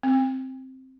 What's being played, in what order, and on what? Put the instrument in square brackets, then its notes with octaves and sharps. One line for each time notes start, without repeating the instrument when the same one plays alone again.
[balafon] C4